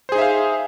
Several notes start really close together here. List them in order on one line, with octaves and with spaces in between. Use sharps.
C5 G#4 D#4 E5 F5